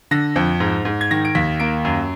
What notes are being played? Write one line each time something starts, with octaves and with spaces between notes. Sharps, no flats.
D3 A#6
F2
G#2
G#2
G#6
D#3 A#6
D7
D#2 B6
A#3 D7
F#2